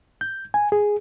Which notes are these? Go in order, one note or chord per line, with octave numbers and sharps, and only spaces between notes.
G6
G#5
G#4